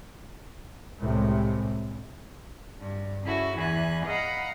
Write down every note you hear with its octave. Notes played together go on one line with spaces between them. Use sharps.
C2 A2 C3 G#3
G2
C#3 E4 F#4 A4
E2 E3 G#5 F#6
D#5 F5 F#5 A#5 B5